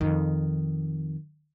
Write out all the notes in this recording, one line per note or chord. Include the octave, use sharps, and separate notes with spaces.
F2 D#3